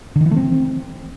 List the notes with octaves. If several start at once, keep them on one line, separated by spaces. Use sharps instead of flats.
D3
D#3
E3
A3
C4